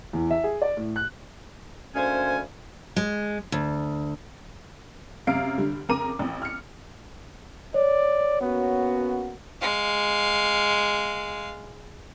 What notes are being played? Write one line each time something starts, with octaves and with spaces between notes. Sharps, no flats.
E2
E5
G#4
D5
A2
F#6
D2 A#3 C#4 C5 G#5
G#3
D2
F#2 C3 F5 F6 C7 D7
D3 G3
F2 C#3 A#4 A#5 D6 D#7
A1 F2
F6 C#7
C#5 D5
A#3 B3 C#4 F#4
G#3 F5